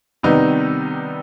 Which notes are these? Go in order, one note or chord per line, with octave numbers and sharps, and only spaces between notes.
C3 D#3 G3 B3 D#4